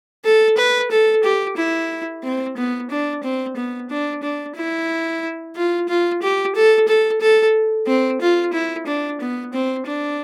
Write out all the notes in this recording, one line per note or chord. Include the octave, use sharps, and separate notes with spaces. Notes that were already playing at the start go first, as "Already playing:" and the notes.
A4
B4
A4
G4
E4
C4
B3
D4
C4
B3
D4
D4
E4
F4
F4
G4
A4
A4
A4
C4
F4
E4
D4
B3
C4
D4